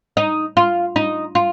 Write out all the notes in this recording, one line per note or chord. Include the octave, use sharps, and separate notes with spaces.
D#4
F4
D#4
F4